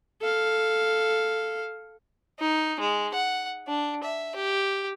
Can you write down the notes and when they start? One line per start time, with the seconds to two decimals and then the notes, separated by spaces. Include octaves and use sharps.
0.21 A4 F5
2.40 D#4
2.80 G#3
3.14 F#5
3.67 D4
4.03 E5
4.35 G4